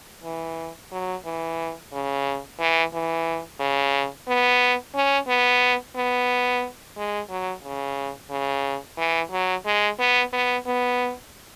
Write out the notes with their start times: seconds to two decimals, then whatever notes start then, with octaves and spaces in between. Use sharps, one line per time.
0.24 E3
0.92 F#3
1.25 E3
1.92 C#3
2.60 E3
2.93 E3
3.60 C#3
4.28 B3
4.95 C#4
5.28 B3
5.96 B3
6.97 G#3
7.29 F#3
7.64 C#3
8.30 C#3
8.98 E3
9.31 F#3
9.66 G#3
9.99 B3
10.33 B3
10.66 B3